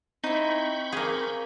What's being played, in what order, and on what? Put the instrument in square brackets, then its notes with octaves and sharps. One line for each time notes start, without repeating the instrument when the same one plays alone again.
[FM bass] C4 [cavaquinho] D#4 E4 [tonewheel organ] B5 C#6 G6
[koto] A#3 G#4 [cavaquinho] F5